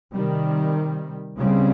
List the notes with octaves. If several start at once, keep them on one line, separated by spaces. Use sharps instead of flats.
C3 D#3 G3
C#3 G3 C4